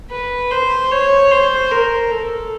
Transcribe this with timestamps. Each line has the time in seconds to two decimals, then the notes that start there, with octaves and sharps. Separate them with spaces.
0.10 B4
0.51 C5
0.91 C#5
1.31 C5
1.71 A#4
2.11 A4